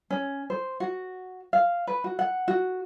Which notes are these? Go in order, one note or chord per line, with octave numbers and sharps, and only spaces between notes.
C#4
C5
F#4
F5
B4
F#4
F#5
F#4